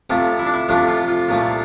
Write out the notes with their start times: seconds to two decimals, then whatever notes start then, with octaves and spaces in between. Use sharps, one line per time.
0.10 F2 C3 F3 A3 C4
0.39 E4
0.46 D4
0.54 E4
0.69 F2 C3 F3 A3 D4
0.88 F4
1.08 F4
1.29 C2 A#2 F3 A3